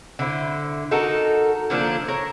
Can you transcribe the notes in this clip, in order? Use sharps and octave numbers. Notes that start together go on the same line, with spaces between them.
D3 E4 C5
D#4 F#4 A4 A#4
D3 F3 A#3 D4
A#4 C#5